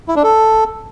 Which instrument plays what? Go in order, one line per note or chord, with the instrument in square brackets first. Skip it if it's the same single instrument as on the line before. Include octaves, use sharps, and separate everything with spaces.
[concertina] E4
D4
A4